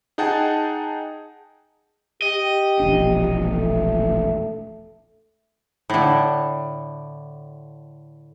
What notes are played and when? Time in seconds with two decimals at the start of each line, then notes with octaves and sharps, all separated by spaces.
0.18 D#4 G#4 F#5 G5 A5
2.22 G4 D#5
2.80 E1 A#1 D4
3.47 A3
5.90 A2 D3